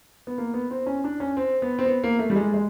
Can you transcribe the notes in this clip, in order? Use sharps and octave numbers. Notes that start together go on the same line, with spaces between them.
B3
A#3
B3
C4
C#4
D4
C#4
C4
B3
C4
B3
A#3
A3
G3
G#3
G#3